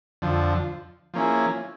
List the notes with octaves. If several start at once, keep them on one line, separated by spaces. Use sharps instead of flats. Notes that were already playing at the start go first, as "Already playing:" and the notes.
F2 D3 F3
F3 A#3 C#4 E4 G#4